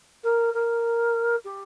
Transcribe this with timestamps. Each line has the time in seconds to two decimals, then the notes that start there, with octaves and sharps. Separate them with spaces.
0.23 A#4
0.54 A#4
1.44 G4